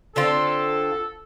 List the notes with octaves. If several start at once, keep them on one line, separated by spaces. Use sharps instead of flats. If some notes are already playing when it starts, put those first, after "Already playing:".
D3 C4 F4 A4